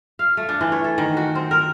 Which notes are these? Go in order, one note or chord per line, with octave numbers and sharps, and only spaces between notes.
F5
A3
D4
E3
C#5
A4
D#3
F#4
C4
A#4